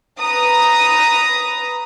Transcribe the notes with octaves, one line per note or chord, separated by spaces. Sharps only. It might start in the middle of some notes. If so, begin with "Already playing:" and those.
B4 A#5 D#6